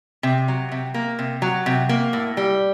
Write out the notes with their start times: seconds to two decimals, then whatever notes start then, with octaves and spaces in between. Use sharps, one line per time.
0.23 C3
0.48 F#3
0.72 C3
0.94 A#3
1.19 C3
1.42 F#3
1.66 C3
1.89 A#3
2.13 A2
2.37 G3